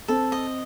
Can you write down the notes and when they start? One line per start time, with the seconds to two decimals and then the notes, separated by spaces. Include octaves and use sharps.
0.08 C4 A4
0.32 D#5